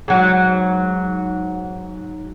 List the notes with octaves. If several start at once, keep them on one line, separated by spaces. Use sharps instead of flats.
G#2 F#3